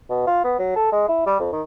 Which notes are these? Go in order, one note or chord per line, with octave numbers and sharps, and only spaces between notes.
B2
F4
B3
F#3
A4
G#3
E4
G3
F2
D#3